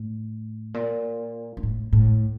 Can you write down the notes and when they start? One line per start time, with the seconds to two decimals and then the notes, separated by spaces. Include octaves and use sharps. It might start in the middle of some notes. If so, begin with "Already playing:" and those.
Already playing: A2
0.74 A#2
1.57 G2
1.63 A2
1.93 A2